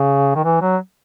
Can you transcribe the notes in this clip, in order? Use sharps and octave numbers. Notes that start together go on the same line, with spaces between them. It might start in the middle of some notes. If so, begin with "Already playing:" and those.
Already playing: C#3
D#3
E3
F#3